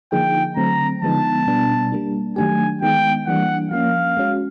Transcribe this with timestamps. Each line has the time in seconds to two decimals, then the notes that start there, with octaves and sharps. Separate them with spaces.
0.12 D3 F3 A#3 D#4 G#4 G5
0.56 D3 F#3 A3 C4 A#5
1.02 D3 F3 G#3 B3 D#4 A5
1.47 B2 G3 B3 D4
1.92 G3 A#3 D4
2.36 D#3 F#3 A3 D4 G4 G#5
2.82 D#3 G#3 B3 D#4 G5
3.27 E3 G3 A#3 D4 F#5
3.71 F3 A#3 C#4 F5
4.17 G#3 C#4 F#4